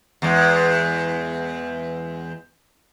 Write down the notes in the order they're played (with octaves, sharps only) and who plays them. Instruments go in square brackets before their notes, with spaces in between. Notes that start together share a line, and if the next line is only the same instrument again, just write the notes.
[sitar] E2 G#3